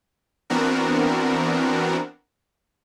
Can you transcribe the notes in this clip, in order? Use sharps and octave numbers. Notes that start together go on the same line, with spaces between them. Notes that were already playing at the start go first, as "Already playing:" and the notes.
E3 B3 C4 D4 F#4 A#4